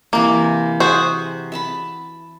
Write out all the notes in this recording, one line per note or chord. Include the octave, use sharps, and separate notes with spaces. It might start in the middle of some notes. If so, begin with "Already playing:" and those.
C3 E3 A#3 G#5
F#4 G#4 C5
E5 A5 B5